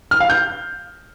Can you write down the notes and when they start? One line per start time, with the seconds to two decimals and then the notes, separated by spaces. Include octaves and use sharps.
0.11 F6
0.20 F5
0.30 G6